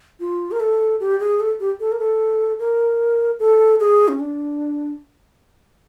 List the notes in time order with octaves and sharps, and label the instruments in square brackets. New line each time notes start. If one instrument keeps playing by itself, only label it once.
[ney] F4
A#4
A4
G4
G#4
A4
G4
A4
A#4
A4
A#4
A4
G#4
C#4
D4